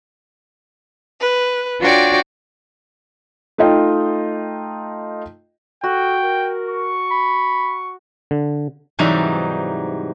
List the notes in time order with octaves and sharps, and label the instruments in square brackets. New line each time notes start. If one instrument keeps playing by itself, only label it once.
[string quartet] B4
D4 F4 F#4 C#5 D5 G5
[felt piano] A3 D#4 F4 D#5 G5
[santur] F#4 [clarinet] A4 [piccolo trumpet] G5
[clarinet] A#4
[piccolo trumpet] C#6
[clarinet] B5
[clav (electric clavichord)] D3
[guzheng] G#2 C3 E3 F#3 G3 D#4